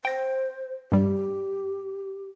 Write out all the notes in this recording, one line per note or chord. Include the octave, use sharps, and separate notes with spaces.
C5 G5 A#6
G2 G3 G4